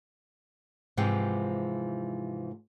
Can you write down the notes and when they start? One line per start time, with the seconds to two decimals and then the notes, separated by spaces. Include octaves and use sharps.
0.97 G#2 C3 E3 F3 G#3 G4